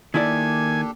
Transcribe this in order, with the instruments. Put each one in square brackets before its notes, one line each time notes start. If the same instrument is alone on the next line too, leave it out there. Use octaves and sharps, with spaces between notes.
[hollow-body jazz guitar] D#3 E4 D5 [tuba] A#3 [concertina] D4 G4 A4 [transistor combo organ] G#5